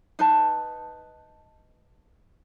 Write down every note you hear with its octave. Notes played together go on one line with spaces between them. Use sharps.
D#4 B4 A5